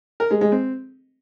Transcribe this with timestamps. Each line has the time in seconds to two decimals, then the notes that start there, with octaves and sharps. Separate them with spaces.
0.20 A#4
0.31 G#3
0.41 G#3
0.52 C4